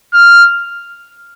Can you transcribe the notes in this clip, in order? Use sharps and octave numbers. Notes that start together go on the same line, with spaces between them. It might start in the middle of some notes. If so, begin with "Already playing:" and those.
F6